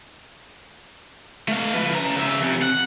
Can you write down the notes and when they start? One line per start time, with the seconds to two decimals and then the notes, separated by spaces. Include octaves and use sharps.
1.48 A3 F5
1.74 F3 B4
1.95 C#3 A#5
2.15 C#3 E5
2.41 F2 C3
2.61 F#5